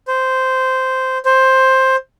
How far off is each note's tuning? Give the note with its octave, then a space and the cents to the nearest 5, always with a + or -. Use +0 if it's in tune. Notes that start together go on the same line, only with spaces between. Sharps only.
C5 -10
C5 +10